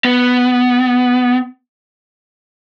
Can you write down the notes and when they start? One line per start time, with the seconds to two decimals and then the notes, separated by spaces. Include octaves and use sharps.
0.05 B3